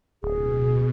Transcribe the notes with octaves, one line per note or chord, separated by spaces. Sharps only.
D1 B2 G#4